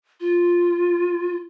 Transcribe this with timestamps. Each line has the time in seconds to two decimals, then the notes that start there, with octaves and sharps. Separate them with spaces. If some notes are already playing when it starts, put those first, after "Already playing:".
0.20 F4